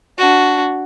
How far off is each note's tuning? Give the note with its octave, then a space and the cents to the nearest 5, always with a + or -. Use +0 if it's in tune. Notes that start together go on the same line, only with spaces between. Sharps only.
D4 -10 F#4 +0